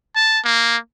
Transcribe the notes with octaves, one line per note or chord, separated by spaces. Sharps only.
A5
A#3